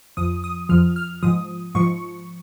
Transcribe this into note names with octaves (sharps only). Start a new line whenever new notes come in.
F2 F3 D#6
D#6
F2 F3 F6
F6
G#2 F3 D#6
G#2 F3 C#6